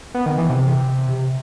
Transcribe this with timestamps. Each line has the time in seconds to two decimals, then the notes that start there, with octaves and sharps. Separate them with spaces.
0.14 B3
0.26 D#3
0.38 E3
0.49 C3